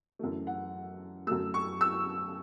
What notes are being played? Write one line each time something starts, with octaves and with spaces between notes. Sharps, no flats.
F#2 E3 A3
F#5
F#2 F#3 A3 E6
C#6
E6